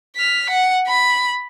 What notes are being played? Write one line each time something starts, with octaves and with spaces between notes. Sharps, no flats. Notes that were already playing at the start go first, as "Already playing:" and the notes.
F6 B6
F#5
B5